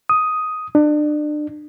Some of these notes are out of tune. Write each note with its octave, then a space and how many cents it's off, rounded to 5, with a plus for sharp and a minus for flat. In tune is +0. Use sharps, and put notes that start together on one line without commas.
D#6 +5
D4 +30